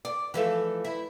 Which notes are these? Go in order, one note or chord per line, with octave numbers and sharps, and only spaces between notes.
D5
E3 F3 A3
E4